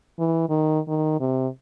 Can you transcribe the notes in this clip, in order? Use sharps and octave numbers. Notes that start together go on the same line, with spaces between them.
E3
D#3
D#3
C3